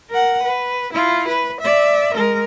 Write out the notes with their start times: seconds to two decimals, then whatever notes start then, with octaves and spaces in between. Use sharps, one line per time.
0.10 A#4 F#5
0.43 B4
0.93 E4 F4
1.28 B4
1.60 D5 E5
2.14 G#3 A#4